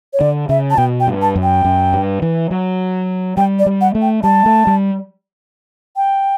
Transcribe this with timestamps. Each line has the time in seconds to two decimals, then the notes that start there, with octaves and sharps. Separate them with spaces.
0.13 C#5
0.21 D3 D5
0.49 C#3 E5
0.71 A5
0.78 B2 G5
1.00 G5
1.07 G2
1.22 A5
1.36 F#2
1.43 G5
1.64 F#2
1.93 G2
2.22 E3
2.51 F#3
3.37 G3 G5
3.59 D5
3.66 G3
3.81 F#5
3.95 A3
4.02 G5
4.23 G3 A5
4.46 A3
4.67 G3
5.96 G5